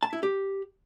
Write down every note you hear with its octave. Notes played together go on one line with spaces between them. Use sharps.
A5
E4
G4